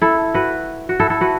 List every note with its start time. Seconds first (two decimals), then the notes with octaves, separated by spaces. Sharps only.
0.01 E4 A4
0.34 F#4 B4
0.89 F#4
1.00 E4 A4
1.10 E4 A4
1.21 F#4 B4